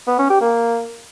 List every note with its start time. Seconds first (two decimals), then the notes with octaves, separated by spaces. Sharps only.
0.08 B3
0.19 C#4
0.30 G4
0.41 A#3